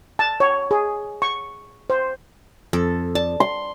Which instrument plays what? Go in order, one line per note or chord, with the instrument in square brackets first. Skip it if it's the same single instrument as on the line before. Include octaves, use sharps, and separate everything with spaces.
[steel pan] A5
C#5
G#4
C#6
C5
[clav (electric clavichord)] F2 [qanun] A4
[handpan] D5 [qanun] A5
[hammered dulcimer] C6